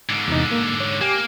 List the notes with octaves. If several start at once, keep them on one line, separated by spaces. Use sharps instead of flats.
G#2 D3
E2 C3 D#4
A#3
C#5
A#3 G4 G#5 D6